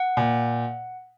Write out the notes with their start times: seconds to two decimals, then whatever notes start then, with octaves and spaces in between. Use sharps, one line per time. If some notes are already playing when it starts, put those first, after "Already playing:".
Already playing: F#5
0.17 A#2